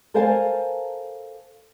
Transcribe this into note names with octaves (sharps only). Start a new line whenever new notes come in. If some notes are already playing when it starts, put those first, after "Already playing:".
A4 A#4 C5 F5 G#5 A5